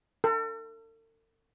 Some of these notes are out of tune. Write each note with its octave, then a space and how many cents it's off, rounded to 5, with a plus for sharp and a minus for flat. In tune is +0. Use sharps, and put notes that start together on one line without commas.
A4 +45